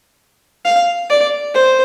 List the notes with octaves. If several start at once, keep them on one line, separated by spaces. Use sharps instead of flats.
F5
D5
C5